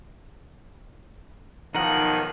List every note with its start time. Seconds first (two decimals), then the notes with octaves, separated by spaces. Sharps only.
1.75 B1 D#3 F3 D#4 A#4 F#5